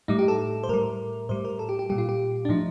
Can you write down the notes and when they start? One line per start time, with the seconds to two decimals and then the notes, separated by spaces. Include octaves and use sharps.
0.08 A2 G3 D#4
0.19 G4
0.28 A4
0.64 C5
0.69 A2 G3 A#4
1.29 A2 G3 C5
1.45 A#4
1.59 A4
1.69 G4
1.79 G4
1.90 A#2 G3 G4
1.98 F4
2.09 G4
2.45 D4
2.49 A2 F3 D#4